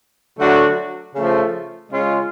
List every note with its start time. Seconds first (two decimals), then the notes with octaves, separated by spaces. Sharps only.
0.39 D3 F#3 A3 D4 F#4
1.15 C#3 F3 A3
1.92 C#3 G#3 C#4 F4